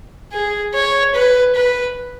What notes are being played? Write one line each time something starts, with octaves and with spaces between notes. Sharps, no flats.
G#4
C#5
B4
B4